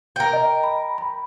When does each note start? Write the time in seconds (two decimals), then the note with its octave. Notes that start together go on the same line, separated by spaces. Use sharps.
0.16 A#4 G5
0.33 D#5
0.63 B5
0.98 B5